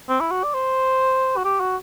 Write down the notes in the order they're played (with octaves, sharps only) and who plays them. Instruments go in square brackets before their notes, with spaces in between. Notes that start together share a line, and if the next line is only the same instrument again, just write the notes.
[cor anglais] C4
E4
F#4
D5
C5
F#4
G4
F#4